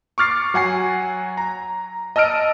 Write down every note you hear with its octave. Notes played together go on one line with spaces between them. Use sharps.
C#6 D6 F6 A6 C7
F#3 F#5 G#5 C7
A#5
D#5 A5 E6 F6 D7